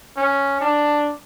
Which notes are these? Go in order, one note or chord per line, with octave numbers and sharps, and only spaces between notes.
C#4
D4